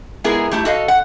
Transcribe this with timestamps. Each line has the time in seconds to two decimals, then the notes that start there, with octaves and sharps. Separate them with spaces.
0.24 G#3 B3 E4 G#4 A#4
0.51 G3 A3 E4
0.65 F#4 A4 D#5 F5
0.88 F#5